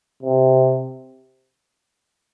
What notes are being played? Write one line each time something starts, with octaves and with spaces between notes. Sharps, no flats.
C3